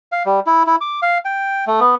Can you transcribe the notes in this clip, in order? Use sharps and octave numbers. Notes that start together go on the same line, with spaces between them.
F5
G3
E4
E4
D6
F5
G5
A3
B3